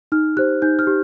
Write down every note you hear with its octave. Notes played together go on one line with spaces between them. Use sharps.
D#4 F6
G4 C5 F#6
D#4 G6
F6
G4